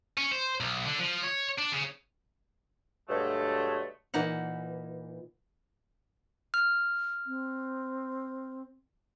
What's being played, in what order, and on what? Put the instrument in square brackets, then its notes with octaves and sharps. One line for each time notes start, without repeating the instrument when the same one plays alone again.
[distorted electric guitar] C#4
C5
B1
D3
F3
C#5
D4
C#3
[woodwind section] G2 B2 D3 F#3 G#3 A3
[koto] A#2 E3 D#4 F#5
[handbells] F6
[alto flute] C4